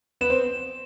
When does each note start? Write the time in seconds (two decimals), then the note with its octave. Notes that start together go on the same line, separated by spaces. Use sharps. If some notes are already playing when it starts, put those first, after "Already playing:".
0.21 B3 B4 E7
0.30 C4 C5